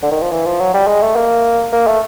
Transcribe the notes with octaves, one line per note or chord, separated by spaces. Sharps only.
D3
D#3
F3
E3
F3
F#3
G3
G#3
A3
A#3
A#3
A3